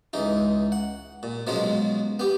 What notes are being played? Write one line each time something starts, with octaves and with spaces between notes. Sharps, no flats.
C#2 E3 D#4
F#5
A#2
B2 F3 F#3 G#3 C#4
B3 G4